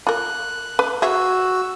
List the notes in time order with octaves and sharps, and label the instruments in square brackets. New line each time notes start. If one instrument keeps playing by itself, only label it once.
[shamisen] F4 A#4 [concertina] F#6
[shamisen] B4
[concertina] F#4 E6 [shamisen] G#4 E5